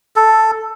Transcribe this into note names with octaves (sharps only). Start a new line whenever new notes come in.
A4